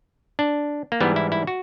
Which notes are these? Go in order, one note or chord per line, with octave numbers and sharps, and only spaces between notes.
D4
A#3
G#2 E3 G3 B3
E4
E4
F#4